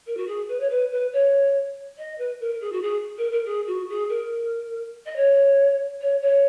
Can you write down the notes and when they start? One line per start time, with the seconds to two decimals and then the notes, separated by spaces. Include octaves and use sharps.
0.07 A#4
0.17 F#4
0.27 G#4
0.48 B4
0.60 C#5
0.69 B4
0.91 B4
1.13 C#5
1.98 D#5
2.18 B4
2.40 A#4
2.61 G#4
2.72 F#4
2.82 G#4
3.18 A#4
3.32 A#4
3.45 G#4
3.67 F#4
3.89 G#4
4.09 A#4
5.06 D#5
5.16 C#5
6.01 C#5
6.22 C#5